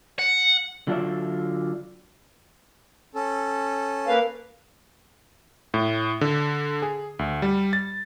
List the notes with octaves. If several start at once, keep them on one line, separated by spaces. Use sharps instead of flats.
F#5
D3 F#3 F4 G#4 D5 E5
C#4 A4
A#3 B4 F5
A2
D3
G#4
D2
G3
A6